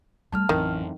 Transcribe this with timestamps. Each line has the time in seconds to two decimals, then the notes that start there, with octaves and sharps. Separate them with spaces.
0.32 G3 A3 A5 F6
0.49 A1 F2 D#3 E3 F#3